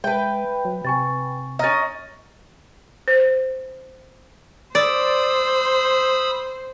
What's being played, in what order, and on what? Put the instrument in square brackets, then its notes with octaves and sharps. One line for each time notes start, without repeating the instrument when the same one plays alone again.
[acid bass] G#3 [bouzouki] B4 G5 [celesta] E5 A5
[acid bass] F#3
[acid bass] C3 [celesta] G#5 C#6 A6
[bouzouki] C#4 D#5 [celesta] A#5 F6 A6
[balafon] C5
[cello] C5 [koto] D5 [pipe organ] B5 D#6 E6